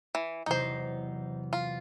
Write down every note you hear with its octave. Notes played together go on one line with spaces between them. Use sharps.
E3
E2 C3 F#3 D#4 C5
F4